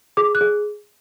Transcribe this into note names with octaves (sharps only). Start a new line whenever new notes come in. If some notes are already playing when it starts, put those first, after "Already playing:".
G#4 D6
F#6
G#4